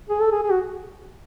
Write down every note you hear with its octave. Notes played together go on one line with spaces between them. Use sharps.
G#4
A4
G#4
G#4
F#4